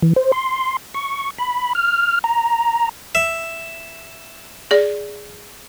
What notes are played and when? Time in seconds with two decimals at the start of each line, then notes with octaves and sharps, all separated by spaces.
0.02 E3
0.16 C5
0.32 C6
0.94 C#6
1.38 B5
1.75 F6
2.24 A#5
3.15 E5
4.71 G#4 D5